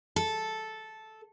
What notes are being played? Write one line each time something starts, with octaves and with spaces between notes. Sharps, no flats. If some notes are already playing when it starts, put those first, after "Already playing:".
A4